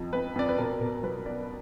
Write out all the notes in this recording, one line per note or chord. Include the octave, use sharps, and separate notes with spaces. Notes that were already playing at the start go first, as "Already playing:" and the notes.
Already playing: F2 F3 D#5
F2 B4
F2 D5
B4
B2 A#4
B2 A#4
F#3 B4
B3 D5